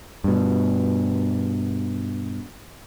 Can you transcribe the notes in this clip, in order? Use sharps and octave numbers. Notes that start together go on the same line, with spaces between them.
G2 B2